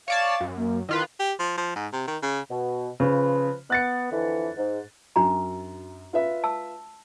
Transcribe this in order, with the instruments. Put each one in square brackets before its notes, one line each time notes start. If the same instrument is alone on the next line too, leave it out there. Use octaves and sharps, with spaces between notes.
[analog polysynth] C#5 D5 A5 [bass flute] F5
[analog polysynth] F#2
[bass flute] A#3
[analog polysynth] D#3 F4 B4 [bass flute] E4
[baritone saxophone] G4
F3
F3
G#2
C3
D#3
C#3
[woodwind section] B2
[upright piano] C#3 [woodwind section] F3 B4
[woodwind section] B3 [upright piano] F#6 A6 C#7
[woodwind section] F2 D3 E3
G#2
[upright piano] F#2 [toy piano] D4 F#4 A#5
[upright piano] F4 B4 E5
[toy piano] A5 E6